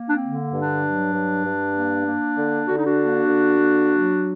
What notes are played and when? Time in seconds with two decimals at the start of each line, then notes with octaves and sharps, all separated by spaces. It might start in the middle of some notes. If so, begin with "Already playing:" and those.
Already playing: A#3
0.08 D4
0.15 C4
0.22 D3
0.53 G2
0.61 D4
0.84 F#3
1.14 G2
1.45 G2
1.75 A#3
2.06 A#3
2.37 D3
2.67 D3 F#4
2.77 D#4
2.86 D4 F#4
2.98 A#3
3.29 D3
3.59 A#3
3.90 F#3